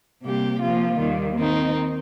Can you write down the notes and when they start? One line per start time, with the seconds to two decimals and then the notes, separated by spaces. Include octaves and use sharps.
0.23 C3 G3 A#3 G4
0.61 F3 A#3 F4
0.98 D#2 D#3 G3
1.36 D#3 C4 D#4